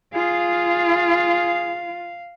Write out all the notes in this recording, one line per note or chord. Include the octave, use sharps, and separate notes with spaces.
F4 G#4 F5